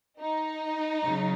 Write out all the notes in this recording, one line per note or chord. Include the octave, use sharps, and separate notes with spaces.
D#4
C#3 F#3